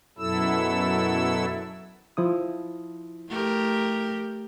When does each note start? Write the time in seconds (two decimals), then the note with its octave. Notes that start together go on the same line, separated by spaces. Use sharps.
0.18 F#2 B2 F#3 E4 A4 E6
2.17 F3 E4 D#6
3.29 A3 G4 A#4